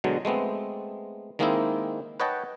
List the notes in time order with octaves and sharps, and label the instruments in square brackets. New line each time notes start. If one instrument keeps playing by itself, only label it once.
[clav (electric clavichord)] B2 D3 F#3 G#3
G#3 A3 B3 C4
D#3 G#3 A#3 C4 D#4 E4
B4 C#5 D#5 F#5 G5 A5